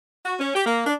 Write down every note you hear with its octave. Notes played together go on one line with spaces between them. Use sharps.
F#4
C#4
G4
A#3
D4